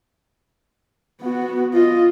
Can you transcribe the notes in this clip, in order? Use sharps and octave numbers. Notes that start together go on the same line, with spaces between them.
B3 F#4
F4 D#5